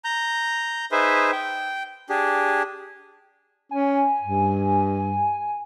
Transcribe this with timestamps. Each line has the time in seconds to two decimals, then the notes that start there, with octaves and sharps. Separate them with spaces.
0.05 A#5 G6
0.92 D#4 G#4 B4 C5 E5
1.32 G5
2.09 D4 G4 G#4
3.71 C#4 G#5
4.22 G2